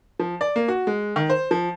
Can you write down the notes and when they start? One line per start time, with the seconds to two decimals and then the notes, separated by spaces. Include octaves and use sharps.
0.19 F3
0.41 D5
0.56 A#3
0.68 F#4
0.87 G#3
1.16 D#3
1.30 C5
1.51 F3